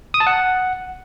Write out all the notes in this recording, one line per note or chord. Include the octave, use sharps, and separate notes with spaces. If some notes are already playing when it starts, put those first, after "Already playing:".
D#6
A5
F#5